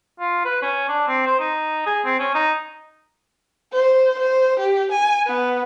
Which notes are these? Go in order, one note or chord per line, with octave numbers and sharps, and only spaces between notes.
F4
B4
C#4
D4
C4
C5
D#4
G#4
C4
C#4
D#4
C5
C5
G4
G#5
B3